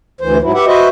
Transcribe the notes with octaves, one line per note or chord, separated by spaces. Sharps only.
D2 E3 C5
G#2 F#3 E4
G4 B4 E5 F#5
F#4 B4 C5 D#5 E5